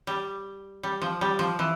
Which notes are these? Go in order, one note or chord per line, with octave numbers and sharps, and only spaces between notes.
G3
G3
F3
G3
F3
E3